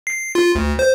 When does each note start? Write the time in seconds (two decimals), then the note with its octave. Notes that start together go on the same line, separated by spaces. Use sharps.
0.07 C7
0.35 F4
0.55 D2
0.79 C5